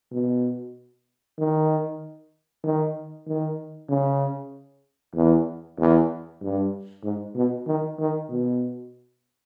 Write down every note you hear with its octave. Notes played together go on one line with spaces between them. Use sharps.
B2
D#3
D#3
D#3
C#3
E2
E2
G2
G#2
B2
D#3
D#3
B2